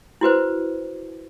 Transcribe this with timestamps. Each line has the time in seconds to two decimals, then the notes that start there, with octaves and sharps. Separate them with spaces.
0.21 E4 F#4 B4 C5